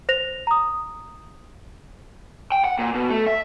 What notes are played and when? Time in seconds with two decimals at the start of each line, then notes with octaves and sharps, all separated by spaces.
0.09 C5 A#6 F7
0.47 A#5 D#6
2.52 G5
2.64 F#5
2.79 A#2
2.94 B2
3.10 A3
3.27 E5